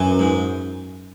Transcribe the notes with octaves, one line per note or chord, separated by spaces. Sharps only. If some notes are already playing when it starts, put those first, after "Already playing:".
Already playing: F#2 E3
G#2